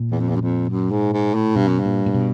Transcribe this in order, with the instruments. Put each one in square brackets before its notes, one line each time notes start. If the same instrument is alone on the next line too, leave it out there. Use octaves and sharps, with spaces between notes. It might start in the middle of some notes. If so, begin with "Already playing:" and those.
Already playing: [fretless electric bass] A#2
[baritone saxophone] E2
F2
E2
F#2
F2
F#2
G#2
G#2
A2
[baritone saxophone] G2 [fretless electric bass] B2
[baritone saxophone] F#2
G2
[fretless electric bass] A#2
A#2
B2